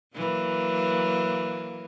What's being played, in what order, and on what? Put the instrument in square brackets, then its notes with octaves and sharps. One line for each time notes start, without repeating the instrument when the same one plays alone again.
[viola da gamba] E3 F#3 A#3